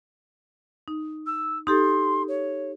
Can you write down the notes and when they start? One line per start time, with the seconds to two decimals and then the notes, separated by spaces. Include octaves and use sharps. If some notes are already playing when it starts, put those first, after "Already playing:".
0.88 D#4
1.26 E6
1.67 D#4 G4 A4 C6
2.28 C#5